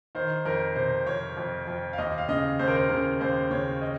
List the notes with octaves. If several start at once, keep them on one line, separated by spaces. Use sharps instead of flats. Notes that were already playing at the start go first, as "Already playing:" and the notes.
D#3 C5
F2 A#4
C3 C5
F2 C#5
F2
F2
F5
D#2 D#5
F5
C#3 D#5
D#2 C5
A#4
C5
C#3 A#4
D#2 C5
C#3 C#5
D#5